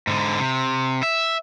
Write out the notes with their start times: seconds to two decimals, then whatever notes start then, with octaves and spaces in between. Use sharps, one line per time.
0.07 G#2 D3
0.40 C3
1.03 E5